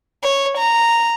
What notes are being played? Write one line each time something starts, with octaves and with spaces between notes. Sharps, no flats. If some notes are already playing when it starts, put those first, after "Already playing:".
C#5
A#5